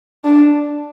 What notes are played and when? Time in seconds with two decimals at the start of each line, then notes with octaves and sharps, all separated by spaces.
0.25 D4